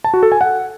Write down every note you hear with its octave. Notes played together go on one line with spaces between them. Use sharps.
A5
F#4
A4
G#5
F#5